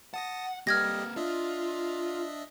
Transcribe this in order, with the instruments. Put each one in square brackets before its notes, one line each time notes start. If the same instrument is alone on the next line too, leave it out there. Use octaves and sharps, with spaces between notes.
[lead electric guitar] F#5 [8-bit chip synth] A5 D#6 A#6
[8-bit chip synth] G3 G4 D#5 [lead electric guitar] A#3 B4 [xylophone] F6 G#6 A#6
[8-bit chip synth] D4 D#5 E5 [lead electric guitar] F4